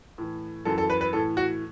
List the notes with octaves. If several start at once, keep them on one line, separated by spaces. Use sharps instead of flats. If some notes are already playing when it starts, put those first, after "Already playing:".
A2 E3
F#2 E3 A4
A4
B4
B4
A2 E3 A4
F#4